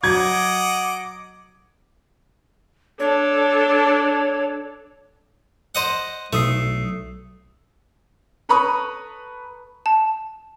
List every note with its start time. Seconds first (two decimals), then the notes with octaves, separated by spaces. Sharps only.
0.03 F#3 D#5 F#5 D6 G#6
3.00 D4 A4 C#5
5.75 C5 D#5 F#5
6.33 B1 A3 D#6 C7
8.49 A4 B4 A#5 B5 C#6 D#6
9.86 A5